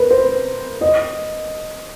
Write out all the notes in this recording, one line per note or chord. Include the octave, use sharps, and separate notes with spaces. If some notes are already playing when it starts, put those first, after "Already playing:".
Already playing: A#4 B4
C5
D#5